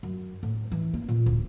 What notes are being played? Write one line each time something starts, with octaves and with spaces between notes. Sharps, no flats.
F#2
A2
E3
A#3
A#2
D1